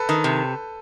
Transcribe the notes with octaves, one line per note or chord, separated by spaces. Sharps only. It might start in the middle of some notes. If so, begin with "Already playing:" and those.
Already playing: A4 B4
D#3
C3